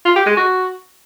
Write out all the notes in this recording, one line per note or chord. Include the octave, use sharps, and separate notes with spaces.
F4
G4
G#3
F#4